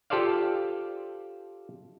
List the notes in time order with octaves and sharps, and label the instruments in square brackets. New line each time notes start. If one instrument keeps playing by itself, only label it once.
[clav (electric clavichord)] F4 G4 A4 C5 D5 F5